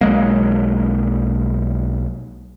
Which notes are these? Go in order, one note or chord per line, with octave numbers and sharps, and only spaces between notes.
B1 F#3 G#3 A#3